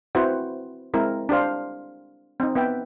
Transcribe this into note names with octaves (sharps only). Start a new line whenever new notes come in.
C4 E4 F#4 B4 C5 F#5
G#3 C4 E4 A#4
D4 G4 C5 F5
C4 D#4
B3 B4 E5 G5